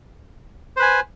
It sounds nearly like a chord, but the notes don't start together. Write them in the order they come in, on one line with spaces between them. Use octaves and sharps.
C5 B4 G#5